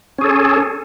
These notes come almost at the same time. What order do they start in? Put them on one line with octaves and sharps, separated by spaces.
C#4 G#4 A4